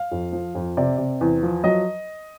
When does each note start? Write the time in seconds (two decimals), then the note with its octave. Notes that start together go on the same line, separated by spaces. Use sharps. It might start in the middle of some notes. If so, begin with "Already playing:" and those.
Already playing: F5
0.12 F2
0.33 F3
0.55 F2
0.77 C3 D5
0.98 C3
1.21 E2
1.43 F3
1.64 F#3 D#5